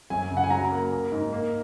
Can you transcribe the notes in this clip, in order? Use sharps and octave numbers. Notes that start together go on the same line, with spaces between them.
F#2 G#5
C#3
F#5
G#5
F#3 A#5
A#3
A#3
G#2
A#3